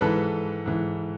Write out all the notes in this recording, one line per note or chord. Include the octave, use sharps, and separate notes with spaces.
G#2 E3 A4 B4
G#2 E3